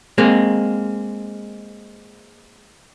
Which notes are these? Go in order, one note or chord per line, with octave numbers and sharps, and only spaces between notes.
G#3 A#3 C4